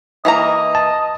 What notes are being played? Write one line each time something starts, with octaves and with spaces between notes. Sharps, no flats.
E3 A#3 D#5 A#5
A5